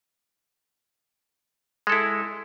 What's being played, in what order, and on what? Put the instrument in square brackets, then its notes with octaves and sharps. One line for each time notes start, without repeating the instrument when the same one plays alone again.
[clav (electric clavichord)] G#3
A4
E4